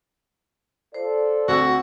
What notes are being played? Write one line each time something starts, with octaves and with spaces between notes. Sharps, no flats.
F4 A4 C5 D5
D2 C4 F#4 E6